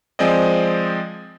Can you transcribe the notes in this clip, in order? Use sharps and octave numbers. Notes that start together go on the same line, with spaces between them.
F3 G#3 C4 G#4 D5 D#5